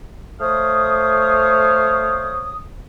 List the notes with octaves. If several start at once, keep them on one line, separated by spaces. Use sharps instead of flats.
A3 C5 C#5 F5 D#6